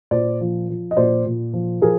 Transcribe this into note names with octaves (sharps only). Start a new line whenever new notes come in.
A#2 C5 D5
F3
F3
D#5
A#2 C5 D5
A#2
F3
F3 G#4 A#4